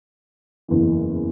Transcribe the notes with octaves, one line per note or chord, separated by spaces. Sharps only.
F#1 E2 C#3 E3